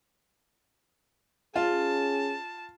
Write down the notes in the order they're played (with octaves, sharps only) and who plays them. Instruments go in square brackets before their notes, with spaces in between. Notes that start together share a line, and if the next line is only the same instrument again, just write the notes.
[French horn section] C#4 G#4 [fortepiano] F4 [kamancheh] A5